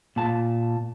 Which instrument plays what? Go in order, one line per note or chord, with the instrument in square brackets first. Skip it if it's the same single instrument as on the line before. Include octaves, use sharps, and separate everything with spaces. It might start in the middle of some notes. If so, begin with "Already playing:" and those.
[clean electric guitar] A#2 A5